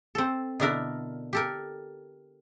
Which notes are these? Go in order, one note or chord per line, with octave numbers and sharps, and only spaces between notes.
C4 A4
B2 D3 D4 E4 A#4
G4 A4 A#4